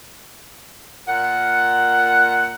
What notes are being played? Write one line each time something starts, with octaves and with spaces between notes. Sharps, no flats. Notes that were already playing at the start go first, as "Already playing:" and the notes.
A#2 F#5